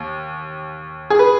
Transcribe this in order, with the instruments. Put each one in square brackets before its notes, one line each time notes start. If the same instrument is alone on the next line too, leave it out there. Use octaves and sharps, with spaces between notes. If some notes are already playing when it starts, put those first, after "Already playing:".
Already playing: [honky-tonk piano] D#2
G#4
B4